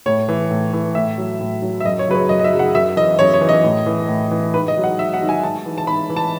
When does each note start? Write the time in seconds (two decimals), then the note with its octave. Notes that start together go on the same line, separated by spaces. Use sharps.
0.06 A2 C#5
0.29 E3
0.51 A2
0.73 E3
0.95 A2 E5
1.18 F#3
1.41 A2
1.62 F#3
1.80 E5
1.85 F#2 D#5
1.99 C#5
2.08 C#3 F#3 B4
2.15 C#5
2.29 F#2 D#5
2.39 D#5
2.44 E5
2.53 C#3 F#3
2.59 F#5
2.75 F#2 E5
2.96 E3 D#5
3.19 F#2 C#5
3.34 C#5
3.41 E3
3.49 D#5
3.64 A2
3.86 E3
4.09 A2
4.31 E3
4.53 G#2 B4
4.68 D#5
4.77 D#3 F#3
4.84 F#5
4.98 G#2 E5
5.14 F#5
5.21 D#3 F#3
5.29 G#5
5.43 G#2 A5
5.66 E3
5.78 A5
5.87 G#2 B5
6.10 E3
6.16 A5